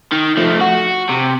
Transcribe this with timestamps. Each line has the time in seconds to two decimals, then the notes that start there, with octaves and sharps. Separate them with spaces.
0.12 D#3
0.37 F3 A3
0.61 F#4
1.09 C3